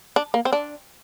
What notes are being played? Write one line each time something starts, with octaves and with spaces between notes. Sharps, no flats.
D4
A#3
C4
D4